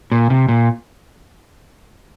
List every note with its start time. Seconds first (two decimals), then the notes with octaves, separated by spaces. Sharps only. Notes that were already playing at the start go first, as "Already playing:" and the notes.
0.12 A#2
0.30 C3
0.49 A#2